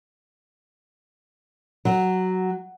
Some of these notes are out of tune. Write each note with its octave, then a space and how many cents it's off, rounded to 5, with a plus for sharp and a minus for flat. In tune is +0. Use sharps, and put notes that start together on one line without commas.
F#3 +5